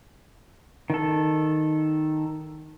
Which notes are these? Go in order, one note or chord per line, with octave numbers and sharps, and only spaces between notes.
D#3 A4